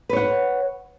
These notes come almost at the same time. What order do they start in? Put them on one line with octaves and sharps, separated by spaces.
B4 C#5 F#5